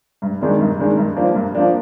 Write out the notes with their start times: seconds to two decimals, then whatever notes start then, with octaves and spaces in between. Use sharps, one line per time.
0.22 G2
0.41 D#3 G#3 D4
0.60 G2
0.79 D#3 G#3 D4
0.97 G2
1.16 F3 A#3 D4
1.35 G2
1.55 F3 A#3 D4